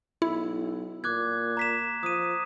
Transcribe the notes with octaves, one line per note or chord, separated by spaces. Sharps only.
B1 E4
A#2 D6 F#6 G#6
A#5 B6 E7
F3 D#6 D#7